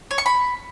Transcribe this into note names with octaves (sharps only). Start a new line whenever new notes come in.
C#5
C#6
B5